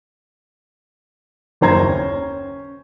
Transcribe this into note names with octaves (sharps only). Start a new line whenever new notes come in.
F#1 D#2 C5 A#5 G#6
C#4